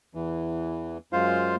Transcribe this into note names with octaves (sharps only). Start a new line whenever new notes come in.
E2 E3
F#2 G#3 F4 C5 F5